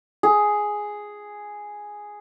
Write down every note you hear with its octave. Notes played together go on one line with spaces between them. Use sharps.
G#4